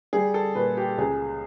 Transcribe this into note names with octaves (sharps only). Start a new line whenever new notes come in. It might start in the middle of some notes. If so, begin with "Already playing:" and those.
G3 G#4
A4
A#2 B4
G4
C#2 G#4